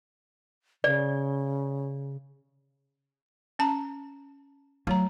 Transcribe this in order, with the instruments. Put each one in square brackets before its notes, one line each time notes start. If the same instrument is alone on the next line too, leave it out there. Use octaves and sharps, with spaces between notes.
[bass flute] C#3 [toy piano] D5
[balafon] C#4 A5 A#5
[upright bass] F#3 [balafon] A3 C#5 A#5